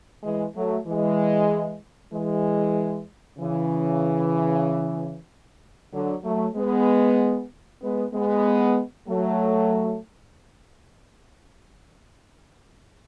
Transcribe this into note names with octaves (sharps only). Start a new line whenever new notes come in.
E3 G#3
F#3 A3
E3 G#3
E3 G#3
C#3 E3
D3 F#3
F#3 A3
G#3 B3
G#3 B3
G#3 B3
F#3 A3